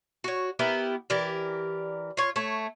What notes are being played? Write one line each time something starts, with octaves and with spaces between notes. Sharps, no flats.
F#4 C#5
B3 E4 G4 A#4
E3 G4 A#4 D5
F4 C#5
A3 C#5